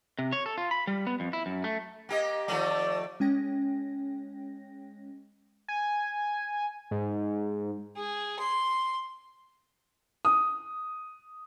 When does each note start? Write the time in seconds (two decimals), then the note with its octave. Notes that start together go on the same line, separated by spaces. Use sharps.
0.19 C3
0.32 C#5
0.46 A4
0.58 F4
0.71 B5
0.87 G3
1.07 B3
1.20 F2
1.33 E4
1.46 F#2
1.64 A3
2.09 A#3 G4 D#5
2.48 D#3 F3 A3 D5
3.20 G#3 C#4 G5 A#6
5.68 G#5
6.91 G#2
7.96 G#4
8.39 C6
10.25 D#6